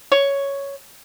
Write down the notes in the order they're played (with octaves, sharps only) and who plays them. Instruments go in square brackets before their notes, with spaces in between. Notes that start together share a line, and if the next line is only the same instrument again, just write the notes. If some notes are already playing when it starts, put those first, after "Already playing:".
[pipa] C#5